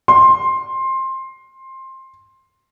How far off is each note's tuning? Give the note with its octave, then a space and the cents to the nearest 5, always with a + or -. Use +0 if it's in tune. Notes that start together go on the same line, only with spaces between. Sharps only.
C6 +15